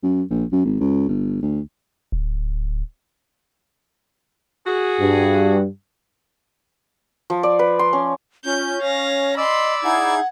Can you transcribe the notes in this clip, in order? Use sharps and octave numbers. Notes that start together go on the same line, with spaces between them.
F#2
A#1
F#2
G#1
C#2
G1
D2
D1
F#4 G#4
G2
F3
D5
B4
C6
C#4
C#4 F4 G6
C#5 F5 A#6
D5 D#5 B5 C6 E6
D#4 E4 G#4 F#5 G#6